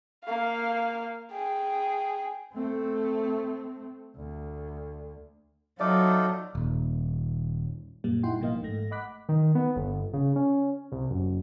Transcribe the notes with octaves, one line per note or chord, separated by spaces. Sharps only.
A#3 F5
G#4 G5
A3 C4
D2
F#3 D#4 F4 A4 D5 E5 D6
D#1
F#2 A#2 G3 A#3
D#4 E4 F#5 G5 C6
A1 B2 F3 A#3 D#5 F5
G#1 G#2 A3 A#6
D#5 F#5 B5 D6 F#6 B6
D#3
B3
G1
C#3
C#4
C2
F#1